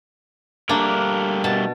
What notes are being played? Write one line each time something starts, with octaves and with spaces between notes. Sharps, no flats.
G3 A3 A#3 D4 A#4
B2 A5